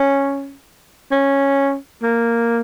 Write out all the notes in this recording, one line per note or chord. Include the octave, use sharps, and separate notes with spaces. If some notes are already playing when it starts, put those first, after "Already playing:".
Already playing: C#4
C#4
A#3